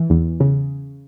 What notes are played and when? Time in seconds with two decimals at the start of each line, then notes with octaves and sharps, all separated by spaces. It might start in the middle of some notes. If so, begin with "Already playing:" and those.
Already playing: E3
0.10 E2
0.40 C#3